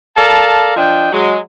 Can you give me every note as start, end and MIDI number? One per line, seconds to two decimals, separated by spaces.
0.17 0.72 69
0.17 0.72 70
0.17 0.72 74
0.17 0.72 77
0.17 0.72 81
0.77 1.12 53
0.77 1.12 62
0.77 1.12 75
0.77 1.12 79
1.13 1.39 54
1.13 1.39 56